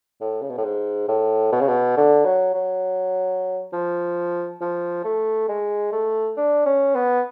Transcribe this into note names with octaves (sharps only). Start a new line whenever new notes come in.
A2
C#3
B2
A2
G#2
A2
B2
C#3
B2
D3
F#3
F#3
F3
F3
A3
G#3
A3
D4
C#4
B3